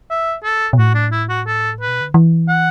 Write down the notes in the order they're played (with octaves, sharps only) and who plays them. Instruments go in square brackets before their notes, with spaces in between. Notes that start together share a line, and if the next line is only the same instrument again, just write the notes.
[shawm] E5
A4
[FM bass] B2
[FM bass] A2 [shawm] F#4
[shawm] D4
E4
F#4
A4
B4
[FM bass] B2
D3
E3
[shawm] F#5